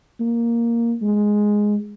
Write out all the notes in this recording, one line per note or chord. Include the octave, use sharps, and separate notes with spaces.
A#3
G#3